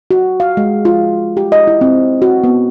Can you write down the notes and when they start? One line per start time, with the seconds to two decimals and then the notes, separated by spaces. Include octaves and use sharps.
0.11 F#4
0.40 F5
0.57 G#3
0.85 F4
1.37 G4
1.52 D#5
1.67 E4
1.81 C4
2.22 F#4
2.44 B3